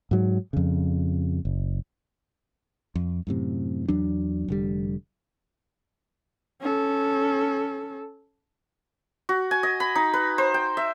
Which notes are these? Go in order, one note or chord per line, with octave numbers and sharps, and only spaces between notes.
G#2 F#3
F2 C#3
F#1
F2
F#2 A2 C3
E2 F#3 D4
F1 D3 G3
C#4 A4
F#4
G#5
D#5
B5
D#4
B4
C5
G5
E5